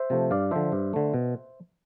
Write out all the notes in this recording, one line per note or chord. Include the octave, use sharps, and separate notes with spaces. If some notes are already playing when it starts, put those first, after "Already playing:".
Already playing: C5 E5
C3 F3 A3
G2 D5 F5
D3 F3 C5 E5
G2
D3 A3
B2